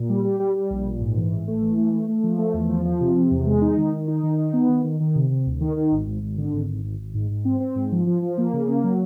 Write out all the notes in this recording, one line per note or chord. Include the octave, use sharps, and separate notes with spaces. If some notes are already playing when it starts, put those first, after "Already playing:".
Already playing: A#2
G3
G3
G3
G3
A#1
A#2
G#2
E3
A1
A3
E3
A3
A3
A3
F3
A3
E2
F3
F3
C3
C3
E2
G#3
D#4
D#3
D#3
D#4
D#3
D#4
B3
D#3
D#3
D#3
C3
C3
D2
D#3
D#3
G#1
G#1
G#1
D3
G#1
G#1
G#1
G#1
G#2
G#2
C4
C4
G#2
F3
F3
F3
A#3
C#3
A#3
F#3